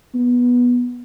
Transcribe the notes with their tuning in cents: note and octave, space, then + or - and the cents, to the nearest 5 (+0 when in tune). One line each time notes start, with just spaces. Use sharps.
B3 -15